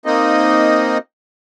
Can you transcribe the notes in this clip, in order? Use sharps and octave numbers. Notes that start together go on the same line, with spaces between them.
A#3 C4 D#4 D#5